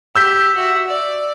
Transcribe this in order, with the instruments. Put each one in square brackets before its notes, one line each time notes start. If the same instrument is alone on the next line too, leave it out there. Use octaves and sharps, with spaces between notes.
[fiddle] G4 [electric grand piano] E6 G6 B6
[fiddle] F#4 E5
D5